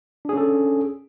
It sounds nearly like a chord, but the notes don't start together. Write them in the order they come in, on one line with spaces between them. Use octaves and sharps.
D4 G#4 C#4 A4